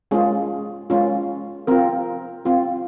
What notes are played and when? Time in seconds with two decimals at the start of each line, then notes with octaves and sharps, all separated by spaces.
0.11 G#3 C#4 F4 G#4
0.90 G#3 C#4 F4
1.67 C4 F4 A#4
2.45 C4 F4